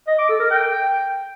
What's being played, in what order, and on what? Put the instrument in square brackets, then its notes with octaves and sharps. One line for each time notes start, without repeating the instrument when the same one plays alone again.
[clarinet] D#5
D6
A4
A#4
G5